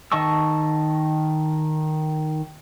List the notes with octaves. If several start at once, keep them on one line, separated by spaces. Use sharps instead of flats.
D#3 D#5 A5 C#6 E6